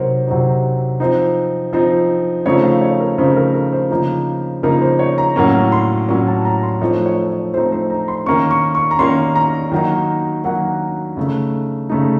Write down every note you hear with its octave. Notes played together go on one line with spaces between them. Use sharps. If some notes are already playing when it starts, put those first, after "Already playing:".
Already playing: C3 F#3 C4 D#4 A#4 C5 C#5
C3 F#3 C4 D#4
F3 C4 D#4
F3 C4 D#4
C#3 F3 A3 C4 D#4 C#5
F5
C#5
A#4
C#3 F3 A3 C4 D#4 C5
A#4
A#4
C5
C#3 F3 A#3 D#4
C#3 F3 A#3 D#4 A#4
C5
C#5
A#5
A2 F#3 A#3 C#4
C6
A2 F#3 A#3 C#4
A5
A#5
C6
F3 A3 C4 D#4 C#5
C#5
C#5
F3 A3 C4 D#4 C5
C5
A#5
C6
D#3 A#3 C#4 C#6
C#6
C#6
A#5
D#3 A#3 C#4 C6
A#5
D#3 F#3 A#3 D#4
D#3 F#3 A#3 D#4 F#5
C#3 A3 D#4
C#3 A3 D#4